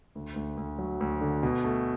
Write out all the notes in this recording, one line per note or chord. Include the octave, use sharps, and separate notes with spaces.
D2
D2
D2
F#3
D2
D3
B2
A3